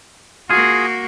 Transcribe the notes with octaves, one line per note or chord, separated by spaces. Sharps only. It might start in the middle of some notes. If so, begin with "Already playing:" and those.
A#3 F4 F#4 G#4